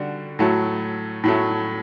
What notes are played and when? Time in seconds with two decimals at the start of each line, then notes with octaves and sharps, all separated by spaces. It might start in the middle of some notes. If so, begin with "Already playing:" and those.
Already playing: D3 G3 F#4
0.39 A2 F#3 A3
1.24 A2 F#3 A3